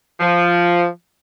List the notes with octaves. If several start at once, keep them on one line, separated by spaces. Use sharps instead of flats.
F3